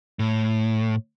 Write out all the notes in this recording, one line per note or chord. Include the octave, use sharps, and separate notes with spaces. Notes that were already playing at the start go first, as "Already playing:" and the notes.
A2